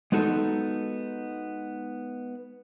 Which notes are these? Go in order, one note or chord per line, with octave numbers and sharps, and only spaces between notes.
G#3 B3 D#4 F#4 A4